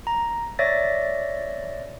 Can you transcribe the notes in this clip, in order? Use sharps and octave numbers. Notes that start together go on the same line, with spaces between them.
A#5
C#5 D5 E5 A6 A#6